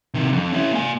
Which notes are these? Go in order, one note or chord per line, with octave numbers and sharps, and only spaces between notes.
C3 D#3
F2
C#4 E4
A#3 G#5